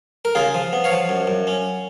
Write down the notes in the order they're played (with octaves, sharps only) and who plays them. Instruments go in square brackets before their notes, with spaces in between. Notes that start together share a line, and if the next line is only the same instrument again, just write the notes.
[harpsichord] A#4
C#3 F4 G#4
F3
B3
C#5 F5
F3
F#2
F#2
C#4